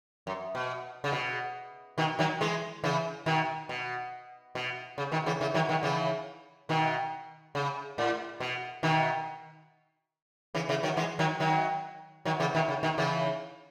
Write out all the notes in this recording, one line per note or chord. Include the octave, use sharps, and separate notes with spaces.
F#2
B2
C#3
B2
B2 D#3
D#3 F#3
E3 G#3
C#3 E3
B2 D#3
B2
B2
C#3
B2 D#3
C#3 E3
C#3 E3
D#3 F#3
B2 D#3
C#3 E3
B2 D#3
C#3
A2
B2
B2 D#3
C#3 E3
C#3 E3
D#3 F#3
E3 G#3
D#3 F#3
D#3 F#3
D#3 F#3
C#3 E3
B2 D#3
C#3
B2 D#3
C#3 E3